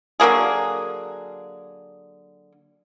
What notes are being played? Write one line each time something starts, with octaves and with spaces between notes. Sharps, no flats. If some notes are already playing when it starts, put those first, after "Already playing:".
D3 F#3 A#3 G#4